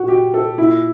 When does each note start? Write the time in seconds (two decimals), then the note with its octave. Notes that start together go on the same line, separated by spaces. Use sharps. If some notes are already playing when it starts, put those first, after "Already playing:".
Already playing: A#2 F#4
0.08 G4
0.34 A4
0.58 A#2 E4